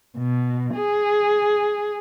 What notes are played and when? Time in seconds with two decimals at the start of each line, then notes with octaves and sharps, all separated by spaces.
0.17 B2
0.75 G#4